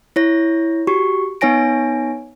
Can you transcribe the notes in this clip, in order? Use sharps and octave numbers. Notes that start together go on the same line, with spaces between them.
E4 C#5 A#6
F#4 G4 C#6
B3 D#4 C#5 G#5 A#6 D7